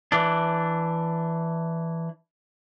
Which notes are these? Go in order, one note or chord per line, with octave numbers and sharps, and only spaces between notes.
E3 D4